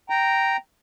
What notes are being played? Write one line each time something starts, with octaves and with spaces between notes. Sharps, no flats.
G5 A#5